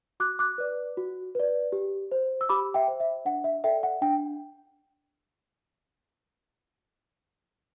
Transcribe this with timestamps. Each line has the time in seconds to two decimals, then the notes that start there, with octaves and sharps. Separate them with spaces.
0.20 F#4 D6 F#6
0.39 D6 F#6
0.58 B4 D5
0.97 F#4
1.35 B4 D5
1.72 G4
2.11 C5
2.41 E6
2.49 G4 B5 D6
2.74 E5 G5
2.88 C5
3.00 E5
3.25 D4 F#5
3.44 E5
3.64 A4 D5 E5 G5
3.83 F#5
4.01 D4 G5